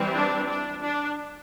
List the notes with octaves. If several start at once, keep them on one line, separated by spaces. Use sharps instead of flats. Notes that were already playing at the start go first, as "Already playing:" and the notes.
Already playing: E3 G3 C4
D4
D4
D4